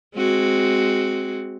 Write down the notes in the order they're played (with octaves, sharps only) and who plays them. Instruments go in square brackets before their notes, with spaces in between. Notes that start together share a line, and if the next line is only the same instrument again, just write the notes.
[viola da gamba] G#3 C4 F#4